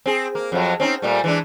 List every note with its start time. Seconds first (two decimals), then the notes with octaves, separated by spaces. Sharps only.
0.06 C4 G#4
0.35 A#3
0.52 F2 F3 F#3
0.80 C4 C#4 D#4
1.02 A#2 G3 A3
1.24 E3 G#3 D4